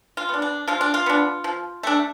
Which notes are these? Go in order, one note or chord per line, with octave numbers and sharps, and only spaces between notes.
F4
B3 D4
D4
F3 F4
D4
F4
B3 D4
F3
A3 D4